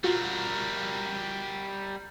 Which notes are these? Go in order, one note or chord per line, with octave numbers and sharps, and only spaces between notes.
G3 F4 F#4 A#4